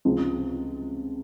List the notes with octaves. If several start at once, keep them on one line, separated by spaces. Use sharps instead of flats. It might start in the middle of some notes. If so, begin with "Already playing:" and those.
C#2 C3 F3 G#3